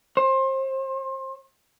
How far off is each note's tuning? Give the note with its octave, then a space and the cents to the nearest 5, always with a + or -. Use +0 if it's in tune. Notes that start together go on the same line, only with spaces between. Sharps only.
C5 +30